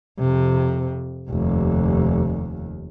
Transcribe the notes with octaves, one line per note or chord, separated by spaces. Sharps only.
F2 C3
F1 D#2